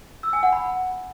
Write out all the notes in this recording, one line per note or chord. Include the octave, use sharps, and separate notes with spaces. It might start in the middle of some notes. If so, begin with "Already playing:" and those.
E6
G#5
F#5
B5